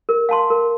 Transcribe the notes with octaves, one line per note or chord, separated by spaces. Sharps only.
A#4
F5 A5 C6
A#4